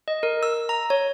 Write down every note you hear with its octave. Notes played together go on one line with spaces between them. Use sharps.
D#5
A#4
E6
A#5
C#5